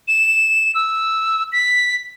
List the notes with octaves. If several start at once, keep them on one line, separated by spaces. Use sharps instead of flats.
E7
E6
B6